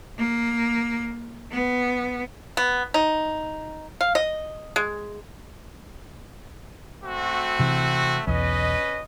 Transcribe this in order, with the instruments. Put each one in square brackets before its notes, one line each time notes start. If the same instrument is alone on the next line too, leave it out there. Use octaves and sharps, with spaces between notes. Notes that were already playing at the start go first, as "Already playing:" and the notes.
[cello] A#3
B3
[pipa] B3
D#4
F5
D#5
G#3
[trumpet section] A3 C4 F#4
[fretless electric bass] C3 E3
[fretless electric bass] B1 E2 [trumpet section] C#4 B4 D#5